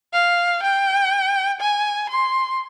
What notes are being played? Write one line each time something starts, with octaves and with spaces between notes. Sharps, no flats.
F5
G5
G#5
C6